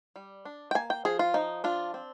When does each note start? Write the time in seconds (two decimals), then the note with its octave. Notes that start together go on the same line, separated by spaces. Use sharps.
0.16 G3
0.45 D4
0.71 G5
0.75 A#3 G#5
0.90 G5
1.05 F3 G#4
1.19 F4
1.34 F3 D#4
1.64 D4 F4
1.94 C4